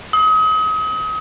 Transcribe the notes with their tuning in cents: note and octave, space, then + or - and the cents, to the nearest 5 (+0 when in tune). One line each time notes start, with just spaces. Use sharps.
D#6 +35